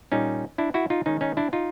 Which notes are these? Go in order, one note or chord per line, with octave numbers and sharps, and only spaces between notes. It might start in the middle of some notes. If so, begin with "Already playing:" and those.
A#2 G3 A#3 C#4 D#4
D4 E4
E4 F#4
D#4 F4
D#3 G#3 C#4 D#4
C#4 D#4
D4 E4
D#4 F4